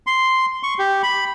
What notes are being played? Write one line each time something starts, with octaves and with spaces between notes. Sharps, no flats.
C6
C#6
G4
B5